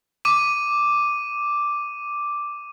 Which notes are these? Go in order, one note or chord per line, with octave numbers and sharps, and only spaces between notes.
D6 D#7